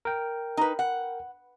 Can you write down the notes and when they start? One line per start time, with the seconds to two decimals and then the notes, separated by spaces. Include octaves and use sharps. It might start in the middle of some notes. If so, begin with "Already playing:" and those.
0.05 A#4 G5
0.57 D#4 B4
0.79 F#5